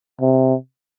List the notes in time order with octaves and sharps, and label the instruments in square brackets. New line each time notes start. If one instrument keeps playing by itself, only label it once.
[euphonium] C3